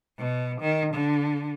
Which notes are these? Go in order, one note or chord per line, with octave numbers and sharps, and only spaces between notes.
B2
D#3
D3